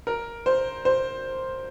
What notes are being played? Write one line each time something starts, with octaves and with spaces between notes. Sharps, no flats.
A#4
C5
C5